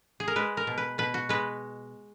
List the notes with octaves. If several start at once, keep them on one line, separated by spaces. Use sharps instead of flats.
G#4
A#4
G#3 B4
A#4
B2
B4
B2 B4
F#4
G#3 B4